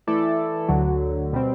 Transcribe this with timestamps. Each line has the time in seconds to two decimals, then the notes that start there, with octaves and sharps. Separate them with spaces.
0.07 E3 A3 E4 A4 D5
0.69 D2 D3 F#3
1.33 B2 G3 C4